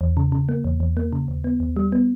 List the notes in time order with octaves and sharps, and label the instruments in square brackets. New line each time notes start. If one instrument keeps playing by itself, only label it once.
[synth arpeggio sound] E2
C#3
C#3
A#3
E2
E2
A#3
C#3
D#2
B3
D#2
G3
B3